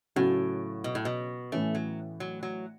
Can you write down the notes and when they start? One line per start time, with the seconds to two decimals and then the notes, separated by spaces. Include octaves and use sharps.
0.16 A2 C#3 F#3 C#4 F#4
0.84 B2
0.95 A2
1.05 B2
1.52 A2 E3 A3 C#4
1.75 F#3
2.20 F#3
2.43 F#3